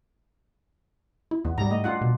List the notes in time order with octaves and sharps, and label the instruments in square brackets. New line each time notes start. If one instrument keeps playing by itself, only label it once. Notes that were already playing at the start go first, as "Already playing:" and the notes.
[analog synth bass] E4
[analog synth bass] E2 [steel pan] B3
[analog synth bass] G#2 [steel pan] G3 A#5
[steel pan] A3 D#5
D4 F4 F#5
[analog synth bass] B2